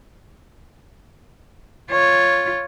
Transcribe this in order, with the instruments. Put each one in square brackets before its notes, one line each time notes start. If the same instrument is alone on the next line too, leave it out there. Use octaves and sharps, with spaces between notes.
[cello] F4 C#5